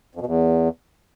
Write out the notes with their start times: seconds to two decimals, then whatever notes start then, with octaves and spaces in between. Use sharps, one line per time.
0.15 F2
0.21 B2
0.26 E2